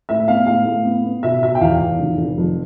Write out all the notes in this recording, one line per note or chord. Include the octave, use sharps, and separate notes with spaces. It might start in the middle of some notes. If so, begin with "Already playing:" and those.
A2 E5
B3 F5
A2 F5
A2
B3
B3
B2 E5
B2 E5
G5
E2 F5
E2
F1
F1
F2